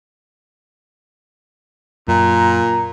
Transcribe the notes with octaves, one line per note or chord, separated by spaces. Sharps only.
F#2 A#2 A#5